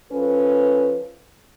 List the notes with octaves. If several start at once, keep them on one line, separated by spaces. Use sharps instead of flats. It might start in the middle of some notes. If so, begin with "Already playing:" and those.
F3 C#4 A4 B4